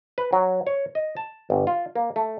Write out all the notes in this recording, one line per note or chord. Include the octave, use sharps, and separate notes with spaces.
B4
F#3
C#5
D#5
A5
G1
F4
A#3
A3